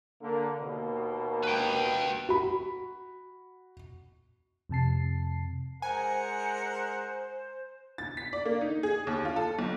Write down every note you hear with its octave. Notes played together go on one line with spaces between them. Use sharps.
D3 A#3
D#2 B2 A#3
B4 G5
F#4 B5
F2 C3 A5 C7
G#3 A#4 C5 F#5 G#5
A6
B6
D5
A#3
D#4
G#4
D#2
F4
A4
B1